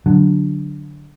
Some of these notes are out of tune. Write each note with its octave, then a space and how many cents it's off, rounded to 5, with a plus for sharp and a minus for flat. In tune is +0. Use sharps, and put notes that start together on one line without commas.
D3 +0 F#3 +0